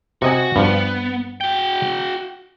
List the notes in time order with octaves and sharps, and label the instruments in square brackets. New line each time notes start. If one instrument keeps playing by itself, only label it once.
[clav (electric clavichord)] C3 D#5 G#5 [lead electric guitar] F#4
[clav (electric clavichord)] G2 F3 [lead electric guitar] B3
[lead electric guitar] F#4 G5